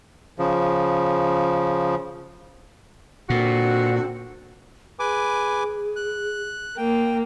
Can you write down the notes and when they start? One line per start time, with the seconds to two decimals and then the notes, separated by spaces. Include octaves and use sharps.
0.39 C#3 F3
3.30 A#2 D3 C4 F#4
4.99 G#4 B4 G#5 D6
5.96 F#6
6.77 A#3 G5